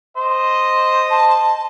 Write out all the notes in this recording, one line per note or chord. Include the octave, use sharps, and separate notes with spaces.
C5 D#5
A5